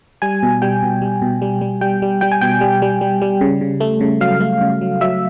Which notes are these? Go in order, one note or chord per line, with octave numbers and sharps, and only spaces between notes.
G3 G#5
B2
G3 G5
B2
G3
B2
G3
G3
G3 G5
G3
G3 G5
G#5
B2 G5
G3
G3
G3
G3
C#3
C#3
A3
C#3
F#3 F5
A3
C#3
F#3
F#3 E5